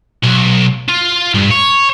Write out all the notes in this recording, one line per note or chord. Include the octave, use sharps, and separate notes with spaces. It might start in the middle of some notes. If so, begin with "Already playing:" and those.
B1
F4
G2
C#5